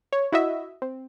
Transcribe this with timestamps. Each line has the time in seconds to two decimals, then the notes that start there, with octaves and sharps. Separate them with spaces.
0.13 C#5
0.32 E4 F#4 D#5 E5
0.82 C4